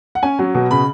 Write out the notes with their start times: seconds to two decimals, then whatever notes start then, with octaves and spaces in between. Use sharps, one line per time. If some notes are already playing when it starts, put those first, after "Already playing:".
0.15 F#5
0.23 C#4 G#5
0.39 F#3
0.55 B2
0.71 C#3 B5